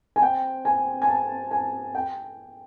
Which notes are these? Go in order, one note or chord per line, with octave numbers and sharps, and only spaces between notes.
G#5
C4 G5
G#5
G#5
A5
G#5
G5